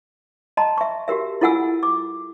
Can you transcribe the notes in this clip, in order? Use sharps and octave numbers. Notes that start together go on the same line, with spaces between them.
D#5 A5 A#5 C6
E5 C#6
F#4 G4 A#4 E5
E4 F4 A4 F#5 G#5 E6
D6